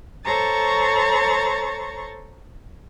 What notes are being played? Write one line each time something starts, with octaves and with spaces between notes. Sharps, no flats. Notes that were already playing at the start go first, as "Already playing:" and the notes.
A4 C5 C#5 A#5 C#6 A6